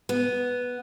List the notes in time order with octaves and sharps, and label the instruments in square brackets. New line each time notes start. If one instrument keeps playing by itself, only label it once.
[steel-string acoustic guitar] B3